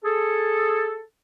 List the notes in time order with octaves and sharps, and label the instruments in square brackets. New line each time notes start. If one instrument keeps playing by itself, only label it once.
[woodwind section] G#4 A4